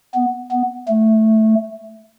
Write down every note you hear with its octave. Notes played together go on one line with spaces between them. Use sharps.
B3
B3
A3